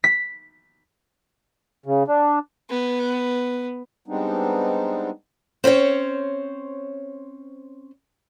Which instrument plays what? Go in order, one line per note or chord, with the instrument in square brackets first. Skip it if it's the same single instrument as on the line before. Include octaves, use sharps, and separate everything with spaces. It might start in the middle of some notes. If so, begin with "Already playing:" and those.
[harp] B6
[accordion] C#3
D4
[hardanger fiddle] B3
[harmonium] G3 G#3 B3 C4 D4 D#4
[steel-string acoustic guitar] C4 C#4 C5 C#5